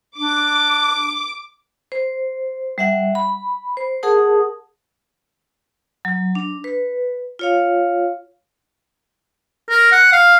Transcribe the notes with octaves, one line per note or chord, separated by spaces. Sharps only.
D4 D6
C5
G3 E5 F#5
B5
C5
G#4 A#4 F#5 A5 D#6
F#3
D4
B4
F4 C#5 F5
A#4
F#5
F5